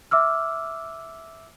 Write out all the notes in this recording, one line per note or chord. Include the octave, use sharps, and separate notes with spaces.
E5 D6 E6 F6